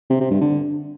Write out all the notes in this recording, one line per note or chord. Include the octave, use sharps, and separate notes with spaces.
C3
C3
G2
D3